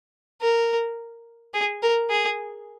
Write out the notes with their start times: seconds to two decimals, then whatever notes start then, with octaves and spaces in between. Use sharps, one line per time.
0.41 A#4
1.54 G#4
1.82 A#4
2.10 G#4